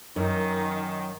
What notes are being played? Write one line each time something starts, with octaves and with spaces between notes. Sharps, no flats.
F#2 D#3